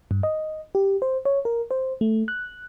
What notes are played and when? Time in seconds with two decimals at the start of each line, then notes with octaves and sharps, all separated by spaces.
0.11 G2
0.23 D#5
0.75 G4
1.02 C5
1.25 C#5
1.45 A#4
1.71 C5
2.01 A3
2.28 F#6